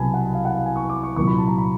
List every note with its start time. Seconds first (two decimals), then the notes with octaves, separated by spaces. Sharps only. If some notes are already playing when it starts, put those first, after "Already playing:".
Already playing: C2 B2 F#3 G#5 A5 B5
0.14 F#5
0.34 F5
0.45 F#5
0.55 F5
0.66 G#5
0.76 C#6
0.89 D6
1.03 C#6
1.16 C2 A#2 F#3 C#6
1.27 B5
1.37 A5
1.47 A#5
1.58 B5